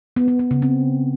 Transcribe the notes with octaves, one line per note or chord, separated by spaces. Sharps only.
B3
B3
B3
C#3
C4